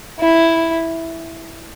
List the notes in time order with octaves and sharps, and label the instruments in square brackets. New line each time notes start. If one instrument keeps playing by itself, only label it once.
[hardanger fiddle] E4